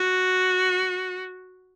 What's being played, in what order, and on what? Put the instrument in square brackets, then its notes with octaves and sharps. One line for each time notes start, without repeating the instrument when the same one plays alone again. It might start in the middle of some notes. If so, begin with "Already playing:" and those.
Already playing: [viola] F#4